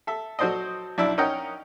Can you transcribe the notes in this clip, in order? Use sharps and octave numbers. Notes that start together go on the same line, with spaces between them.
A4 E5
F#3 F#4 A4 C5 D5 D#5
B1 D4 E4 D5 E5
C#4 D#4 A#4 D#5 F#5 G5